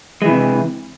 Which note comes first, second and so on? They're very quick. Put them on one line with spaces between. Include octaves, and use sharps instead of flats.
G#3 E3 C3